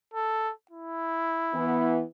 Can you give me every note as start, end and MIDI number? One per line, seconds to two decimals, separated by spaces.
0.14 0.52 69
0.71 2.00 64
1.54 2.02 52
1.54 2.02 59